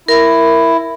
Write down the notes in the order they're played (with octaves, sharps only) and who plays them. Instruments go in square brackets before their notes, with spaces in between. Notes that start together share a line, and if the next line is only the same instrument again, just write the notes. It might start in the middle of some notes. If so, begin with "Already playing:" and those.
[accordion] E4 [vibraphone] A#4